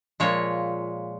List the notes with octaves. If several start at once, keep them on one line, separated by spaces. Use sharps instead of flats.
A#2 F3 G#3 C#5